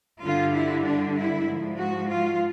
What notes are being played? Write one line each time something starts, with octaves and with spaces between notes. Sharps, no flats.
G2 D3 G3 F4
E4
D4
E4
G#2 F3
F#4
F4